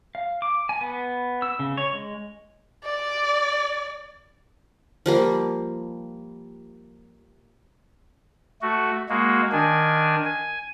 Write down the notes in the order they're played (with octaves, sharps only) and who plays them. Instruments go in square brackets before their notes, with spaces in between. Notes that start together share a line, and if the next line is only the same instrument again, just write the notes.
[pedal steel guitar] F5
D6
G#5
B3
E6
C#3
C#5
G#3
[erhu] D5
[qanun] F3 G3 A#3
[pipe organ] A3 F#4
G#3 A#3 F#4
D#3 D4 G#5
G#5